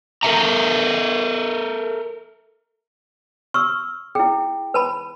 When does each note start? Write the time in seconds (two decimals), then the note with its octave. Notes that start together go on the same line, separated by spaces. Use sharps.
0.23 A4 A#4 D5 E5 A#5
3.54 C#6 E6 F6
4.15 E4 G#4 G5
4.74 B4 A5 B5